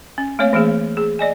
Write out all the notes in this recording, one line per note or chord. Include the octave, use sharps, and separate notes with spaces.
C#4
A3 A#3 C4 C#5 F5
E3 A3 A#3 G#4
G#4
D5 D#5 G#5